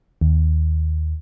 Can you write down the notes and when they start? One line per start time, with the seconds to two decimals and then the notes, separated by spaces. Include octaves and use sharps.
0.21 D#2